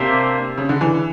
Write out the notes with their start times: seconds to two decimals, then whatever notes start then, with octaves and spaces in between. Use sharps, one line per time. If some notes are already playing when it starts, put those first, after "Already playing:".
Already playing: C3 A#3 D4 G4 C5 E5
0.58 C#3
0.69 D3
0.81 E3